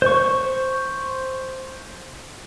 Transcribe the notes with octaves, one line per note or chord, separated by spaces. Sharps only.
C5 C#6